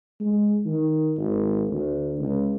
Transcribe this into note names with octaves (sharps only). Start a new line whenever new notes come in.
G#3
D#3
G#1
D2
C#2